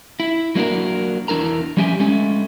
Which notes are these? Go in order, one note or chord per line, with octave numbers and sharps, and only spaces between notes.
E4
F#3 A#3 D4 F#4 A#4
E2 D4 E4 A#4 A#5
F3 G3 C#4 G4 E5 G#5
G#3 A3 C#4